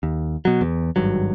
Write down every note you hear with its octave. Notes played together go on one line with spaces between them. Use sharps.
D#2
B2 F#3
E2
G#1 G2 F#3